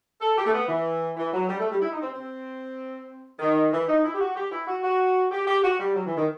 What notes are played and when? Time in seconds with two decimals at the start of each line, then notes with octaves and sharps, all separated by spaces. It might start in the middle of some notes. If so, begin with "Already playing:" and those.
0.20 A4
0.37 G4
0.46 A3
0.53 B3
0.68 E3
1.17 E3
1.33 F#3
1.48 G3
1.59 A3
1.70 G3
1.80 E4
1.91 D#4
2.02 C4
2.12 C4
3.39 D#3
3.72 E3
3.88 D#4
4.04 E4
4.14 G4
4.20 F#4
4.36 G4
4.51 E4
4.67 F#4
4.83 F#4
5.31 G4
5.46 G4
5.63 F#4
5.79 G3
5.95 F#3
6.06 E3
6.16 D#3